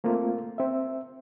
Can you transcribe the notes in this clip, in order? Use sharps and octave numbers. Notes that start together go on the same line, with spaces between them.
A3 A#3 C4 F4
C4 E5